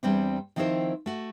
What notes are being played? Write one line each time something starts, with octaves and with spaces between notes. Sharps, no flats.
E2 G3 C4 D4
D#3 F3 C4 E4 A#4 C5
A3 F#4